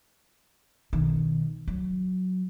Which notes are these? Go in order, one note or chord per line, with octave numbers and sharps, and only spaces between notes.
B1 D#3
F#3